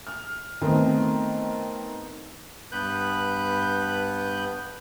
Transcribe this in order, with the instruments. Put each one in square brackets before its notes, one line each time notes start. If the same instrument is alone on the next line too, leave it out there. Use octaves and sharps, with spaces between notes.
[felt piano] F6
D#3 A3 B3 C4 D#4
[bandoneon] G2 B3 B4 F#6 G6